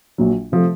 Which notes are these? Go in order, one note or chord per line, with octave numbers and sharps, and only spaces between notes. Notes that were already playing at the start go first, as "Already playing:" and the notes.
A#1 A#2 F#3
C3 F3 A3